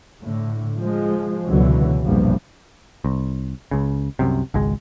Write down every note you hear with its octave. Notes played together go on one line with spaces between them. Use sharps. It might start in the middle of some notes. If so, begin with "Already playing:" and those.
A2 D3
F3 G#3
C#2 B2 D3 E3 F#3
A#1 E2 G2 B2 F3
C2
C#2 C#3
C2 F#2 C3
G#1 C#2 G#3